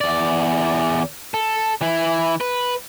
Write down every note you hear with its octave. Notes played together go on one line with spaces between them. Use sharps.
E2 D5
A4
E3 E4
B4